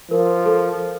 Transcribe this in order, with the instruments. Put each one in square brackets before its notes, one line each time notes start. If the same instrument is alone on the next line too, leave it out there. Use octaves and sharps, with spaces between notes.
[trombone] F3 [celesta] A#4
[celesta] A4